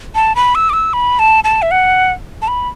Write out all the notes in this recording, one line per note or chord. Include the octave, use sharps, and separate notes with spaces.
A5
B5
E6
D6
E6
B5
A5
A5
E5
F#5
A5
B5